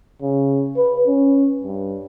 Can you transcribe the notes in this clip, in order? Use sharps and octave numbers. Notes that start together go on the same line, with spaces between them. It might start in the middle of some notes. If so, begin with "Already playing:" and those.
C#3
B4
C#4
G2